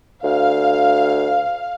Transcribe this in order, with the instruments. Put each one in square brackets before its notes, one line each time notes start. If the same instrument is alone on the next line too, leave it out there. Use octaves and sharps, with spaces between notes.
[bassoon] D2 [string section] F5